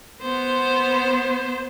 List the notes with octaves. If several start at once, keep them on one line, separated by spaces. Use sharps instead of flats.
B3 C5